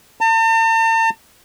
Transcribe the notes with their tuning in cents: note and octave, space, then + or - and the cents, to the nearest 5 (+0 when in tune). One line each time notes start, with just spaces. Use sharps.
A5 +45